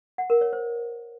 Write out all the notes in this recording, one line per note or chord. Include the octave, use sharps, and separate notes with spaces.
F#5
A#4
C#5
C5